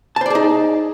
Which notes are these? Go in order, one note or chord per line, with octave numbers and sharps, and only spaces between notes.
D#4 G#4 C5 D5 A5